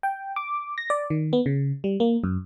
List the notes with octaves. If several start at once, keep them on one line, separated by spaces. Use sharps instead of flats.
G5
D6
A#6
D5
D#3
B3
C#3
G3
A#3
F#2